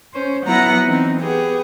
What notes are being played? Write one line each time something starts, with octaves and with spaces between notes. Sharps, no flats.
C#4 C5
F#3 B3 E4 F#5 A#5 A#6
E3 C4 D#4
B3 G4 G#4